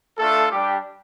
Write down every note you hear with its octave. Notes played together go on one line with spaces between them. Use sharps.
A3 D4 F4 A4
G3 D4 G4